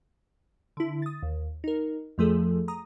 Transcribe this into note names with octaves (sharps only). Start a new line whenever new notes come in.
D3 E4
D#6 A6
D#2
D#4 A#4
F2 F3 A3 G#4 A4
A#5 D#6